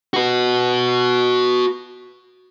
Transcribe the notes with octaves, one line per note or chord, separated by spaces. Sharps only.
F#4 B4